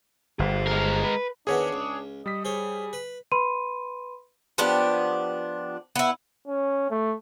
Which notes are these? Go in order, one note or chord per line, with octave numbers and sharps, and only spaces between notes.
G1 G#4 C5
G#3 A#4
B4
E2 D#3 B3 D4 G#4 C#5
C#2
G3 D#5 B6
G#4 C5 C#5
B4
B4 B5 C6 D#7
F3 B3 D4 G4
B3 E4
C#4
A3